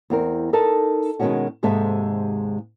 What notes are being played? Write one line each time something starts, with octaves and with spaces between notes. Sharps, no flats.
E2 C4 A#4
D#4 A4 A#4 D#5 A5
B2 D#3 F#3 G#3 C#4 F#4
D#2 G#2 C3 G#3 A4 E5